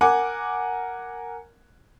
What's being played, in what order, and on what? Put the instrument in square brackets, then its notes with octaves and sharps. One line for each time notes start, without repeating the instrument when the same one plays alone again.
[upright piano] A#4 F#5 G#5 D6